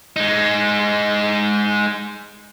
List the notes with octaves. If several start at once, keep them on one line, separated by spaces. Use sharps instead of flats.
G#3 D#4